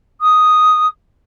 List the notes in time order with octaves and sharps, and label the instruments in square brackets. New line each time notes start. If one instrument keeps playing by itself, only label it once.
[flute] D#6